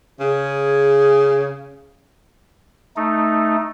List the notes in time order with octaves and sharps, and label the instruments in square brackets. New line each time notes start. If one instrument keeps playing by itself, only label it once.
[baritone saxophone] C#3 [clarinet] G#4
[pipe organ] A3 D#4